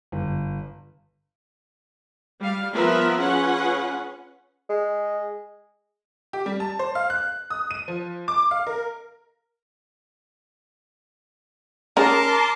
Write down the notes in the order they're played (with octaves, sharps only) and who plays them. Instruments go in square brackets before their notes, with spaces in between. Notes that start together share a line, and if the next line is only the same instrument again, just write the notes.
[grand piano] G1
[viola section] G3 F5
F3 B3 F4 A#4 B4 E5
C#4 F4 G#4 B4 F#5
[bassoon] G#3
[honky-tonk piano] G4
G3
A5
C5
F5
F#6
D#6
D#7
F3
D6
F5
A#4
[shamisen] C#4 D#4 G#4 [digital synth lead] A#4 [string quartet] A5 C6 D6